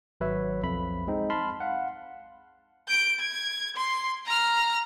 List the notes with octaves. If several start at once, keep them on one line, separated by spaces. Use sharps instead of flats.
G#1 F#3 B4 C#5 E5
B1 F2 B5
G#3 C4 D#4
A5 B5 C6 F6
F5 F#5
G6 D7
G#6
C6
A#5 F6